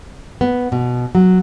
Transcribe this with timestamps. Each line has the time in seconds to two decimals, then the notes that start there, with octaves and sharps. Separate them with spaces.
0.41 B3
0.72 B2
1.15 F#3